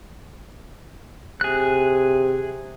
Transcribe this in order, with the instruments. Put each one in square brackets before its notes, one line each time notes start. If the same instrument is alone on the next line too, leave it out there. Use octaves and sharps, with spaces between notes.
[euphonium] C3 [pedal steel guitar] G#4 F#6